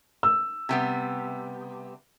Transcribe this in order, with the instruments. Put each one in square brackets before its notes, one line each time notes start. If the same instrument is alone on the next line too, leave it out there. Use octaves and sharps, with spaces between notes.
[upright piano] E6
[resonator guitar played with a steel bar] C3 G3 B3